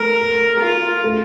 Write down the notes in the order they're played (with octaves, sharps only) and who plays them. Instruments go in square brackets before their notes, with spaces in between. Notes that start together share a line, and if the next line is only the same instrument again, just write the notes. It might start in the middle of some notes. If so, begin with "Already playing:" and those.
Already playing: [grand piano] A3 [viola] A#4
[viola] F4
[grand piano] A3